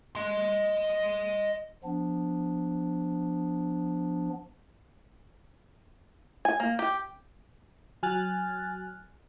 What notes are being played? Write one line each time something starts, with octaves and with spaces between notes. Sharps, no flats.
D#5 C6
F3 B3 D4
G#5
A#3
G4
F#3 G#5 F6 F#6 A6